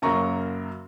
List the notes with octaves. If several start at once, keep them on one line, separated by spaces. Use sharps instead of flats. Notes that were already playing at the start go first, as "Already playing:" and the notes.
F#2 C#3 F#3 A#3 A#5 C#6